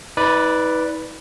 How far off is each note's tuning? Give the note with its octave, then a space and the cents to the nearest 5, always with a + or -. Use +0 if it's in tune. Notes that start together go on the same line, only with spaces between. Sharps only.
D#4 +45 B4 +0 D5 +0